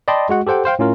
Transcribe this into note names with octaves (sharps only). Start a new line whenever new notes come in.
D5 D#5 G5 A5 B5 C6
G#3 F#4 F#5
G4 A4 C5 F#5 G5
C5 F5 G5
A2 C#4 F4 A#4